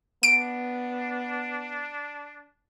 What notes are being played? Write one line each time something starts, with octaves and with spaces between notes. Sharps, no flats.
B3 D4 D7